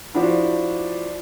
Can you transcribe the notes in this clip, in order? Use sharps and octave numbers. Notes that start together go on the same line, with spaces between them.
F3 D4 E4 F#4